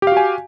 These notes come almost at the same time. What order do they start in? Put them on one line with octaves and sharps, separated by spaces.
G4 F5 F#4 G#5